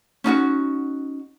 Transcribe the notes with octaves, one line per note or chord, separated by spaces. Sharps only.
C#4 D#4 F4 F#4